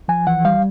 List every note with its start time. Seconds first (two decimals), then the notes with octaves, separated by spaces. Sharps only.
0.08 F3 G#5
0.27 E3 F#5
0.45 G3 F5